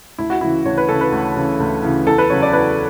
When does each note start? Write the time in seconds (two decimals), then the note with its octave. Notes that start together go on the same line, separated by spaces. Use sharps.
0.18 D2 E4
0.30 F#4
0.41 C#3 E3 E4
0.66 D2 C#5
0.78 B4
0.89 C#3 E3 A4
1.01 B4
1.12 D2
1.36 C#3 E3
1.60 D2
1.83 C#3 E3
2.06 E2 A4
2.18 B4
2.30 C#3 F#3 C#5
2.42 D5
2.53 E2 B4